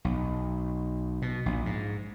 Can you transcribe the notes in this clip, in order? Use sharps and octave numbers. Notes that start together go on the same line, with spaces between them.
B1
B2
A#1
G#2